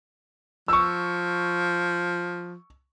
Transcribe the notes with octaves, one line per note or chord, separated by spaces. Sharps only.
F3 C#6 E6